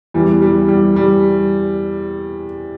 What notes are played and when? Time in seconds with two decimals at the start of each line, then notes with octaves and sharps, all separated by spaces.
0.14 E2 E3 G3
0.42 G3
0.68 G3
0.96 G3